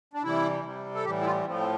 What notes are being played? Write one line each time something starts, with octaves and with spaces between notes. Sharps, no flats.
D4
C3 E3 G3 E4
C3 G3
A4
A2 E3 G3 G4
E4
F4
A2 F3 C4
C4